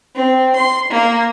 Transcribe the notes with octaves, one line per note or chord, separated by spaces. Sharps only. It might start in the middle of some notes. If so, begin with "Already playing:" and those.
C4
C6
A#3